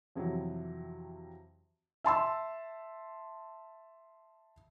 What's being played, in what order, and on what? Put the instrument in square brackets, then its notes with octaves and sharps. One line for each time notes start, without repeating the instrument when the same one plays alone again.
[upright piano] F2 C3 E3 F#3
[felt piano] E5 A5 C6 E6